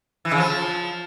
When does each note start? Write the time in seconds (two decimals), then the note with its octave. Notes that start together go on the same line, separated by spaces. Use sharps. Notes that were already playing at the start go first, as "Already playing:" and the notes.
0.25 E3
0.32 C#3
0.38 F3